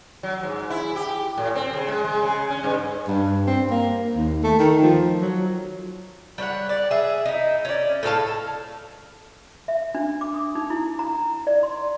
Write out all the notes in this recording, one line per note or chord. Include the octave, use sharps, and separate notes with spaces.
F#3
G#2
E4
G4
A2
C4
C#3
G#3
G#3
C#3
C#4
G2
G2
C4
A#3
D#2
A3
D#3
F3
F#3
G3 C#5 F5 F#5
D5
G#4 E5
D#4 E4
C#4 D5
A2 A4 F5 A5
E5
D4
D6
D#6
D#4
E4
A#5
D5
C6